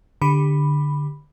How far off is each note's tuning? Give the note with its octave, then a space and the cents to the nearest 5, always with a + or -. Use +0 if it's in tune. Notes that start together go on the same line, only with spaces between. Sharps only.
D3 +0 G4 +20 B5 +0